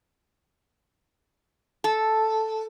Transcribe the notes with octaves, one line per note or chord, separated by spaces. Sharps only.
A4